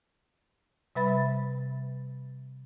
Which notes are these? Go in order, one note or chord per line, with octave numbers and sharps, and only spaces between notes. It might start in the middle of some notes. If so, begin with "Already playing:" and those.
C3 G3 B4 E5 B5 A6